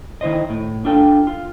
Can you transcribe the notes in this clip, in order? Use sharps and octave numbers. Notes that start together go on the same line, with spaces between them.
D#3 E4 C5 D#5
A2
D4 F4 A4 G5
F4